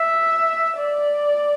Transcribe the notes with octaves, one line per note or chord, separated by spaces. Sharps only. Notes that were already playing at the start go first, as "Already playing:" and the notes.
Already playing: E5
D5